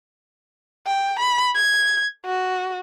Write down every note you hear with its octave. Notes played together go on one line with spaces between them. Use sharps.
G5
B5
G#6
F#4